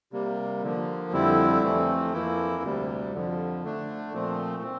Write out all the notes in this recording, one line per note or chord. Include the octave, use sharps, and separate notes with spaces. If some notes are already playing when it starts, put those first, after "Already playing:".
C3 G3 A#3
D3 F3 A#3
F2 D3 G3 C4 E4
F2 E3 A3 C4
F2 E3 A#3 E4
D2 C3 G3
F2 D3 F3
D3 A3 D4
A#2 F3 A3 C4
C4